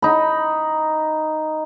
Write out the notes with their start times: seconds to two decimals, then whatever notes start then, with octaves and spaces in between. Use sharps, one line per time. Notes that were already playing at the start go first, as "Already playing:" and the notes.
0.02 D#4 B5